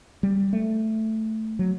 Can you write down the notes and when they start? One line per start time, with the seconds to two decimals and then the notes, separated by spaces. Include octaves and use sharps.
0.23 G3
0.53 A3
1.59 F#3